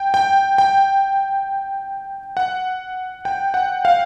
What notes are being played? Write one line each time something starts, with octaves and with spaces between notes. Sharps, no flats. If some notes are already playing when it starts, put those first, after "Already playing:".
Already playing: G5
G5
G5
F#5
G5
F#5
F5